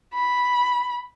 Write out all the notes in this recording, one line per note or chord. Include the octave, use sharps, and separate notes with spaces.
B5